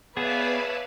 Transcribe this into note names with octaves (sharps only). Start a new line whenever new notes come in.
B3 G#4 B4 C#5 D5 E5 F5 A5